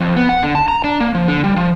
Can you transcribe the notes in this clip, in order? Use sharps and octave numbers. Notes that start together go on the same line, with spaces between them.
F2
B3
F#5
D3
A5
A#5
D4
A#3
F3
D3
G3
F3